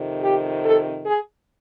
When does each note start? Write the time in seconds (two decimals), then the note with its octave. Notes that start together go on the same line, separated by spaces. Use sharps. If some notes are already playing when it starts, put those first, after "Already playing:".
Already playing: F2 C3 D#3
0.21 G4
0.62 A4
1.03 G#4